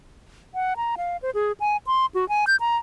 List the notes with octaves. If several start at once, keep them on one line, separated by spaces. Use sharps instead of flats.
F#5
A#5
F5
C5
G#4
G#5
C6
F#4
G#5
G6
A#5